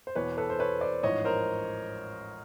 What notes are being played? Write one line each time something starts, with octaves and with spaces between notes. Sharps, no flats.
C5
E2 B2 B4 C#5
A4 B4
C5
B4 C#5
C5 D5
A1 G#2 F3 C#5 D#5
A#4 C5